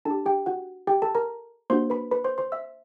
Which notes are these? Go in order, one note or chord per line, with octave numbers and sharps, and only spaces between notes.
D4 A4 A5
G4
G4 G5
F#4 F#5
G4 G5
A4 A5
A#4 A#5
A#3 D4 F#4 C5 C6
B4 B5
B4 B5
C5 C6
C5 C6
E5 E6